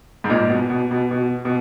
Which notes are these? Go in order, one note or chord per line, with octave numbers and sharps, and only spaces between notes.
G#2
A#2
B2
B2
B2
B2
B2